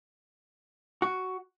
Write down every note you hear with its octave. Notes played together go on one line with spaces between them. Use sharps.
F#4